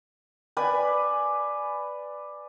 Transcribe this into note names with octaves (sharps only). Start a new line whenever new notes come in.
B4 D5 G#5 B5